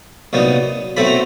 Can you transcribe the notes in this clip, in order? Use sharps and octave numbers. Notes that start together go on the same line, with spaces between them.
C2 A#2 F#3 B3 D#4
B1 A2 F#3 A3 C4 B5
A#5